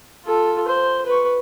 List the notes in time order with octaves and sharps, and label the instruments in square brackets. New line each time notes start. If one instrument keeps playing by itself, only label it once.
[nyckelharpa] F4 A4
C5
B4 C#6